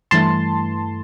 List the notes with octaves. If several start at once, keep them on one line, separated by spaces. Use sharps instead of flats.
G2 E3 A3 A5 C6